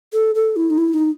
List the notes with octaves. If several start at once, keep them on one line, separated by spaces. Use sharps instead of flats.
A4
A4
E4
D#4
E4
D#4